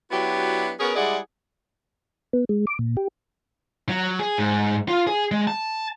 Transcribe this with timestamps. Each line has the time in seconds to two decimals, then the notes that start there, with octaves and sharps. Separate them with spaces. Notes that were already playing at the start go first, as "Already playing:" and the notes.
0.11 F#3 B3 D4 E4 F#4 G4
0.80 B3 C#4 F#4 G#4 A#4
0.96 G3 G#3 E4 G#4 D5 F#5
2.33 B3
2.49 G#3
2.67 D6
2.79 A#2
2.97 G4
3.89 F#3
4.20 G#4
4.38 G#2
4.88 F4
5.07 G#4
5.31 G#3
5.48 A5